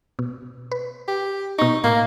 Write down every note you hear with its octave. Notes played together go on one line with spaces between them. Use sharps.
B2
B4
G4
B2 D#4 C#6
A2 A#3